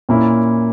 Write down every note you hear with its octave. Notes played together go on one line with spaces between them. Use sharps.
A#2 A#3 C#4 E4